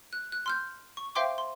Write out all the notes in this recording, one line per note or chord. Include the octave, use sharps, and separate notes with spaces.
F#6
F#6
C6 F6 G6
C#6
C5 E5 F5 G5 C6 D6
C6